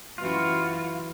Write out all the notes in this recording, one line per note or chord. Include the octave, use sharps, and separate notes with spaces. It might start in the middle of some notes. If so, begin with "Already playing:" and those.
F#2 E3 F4 F#4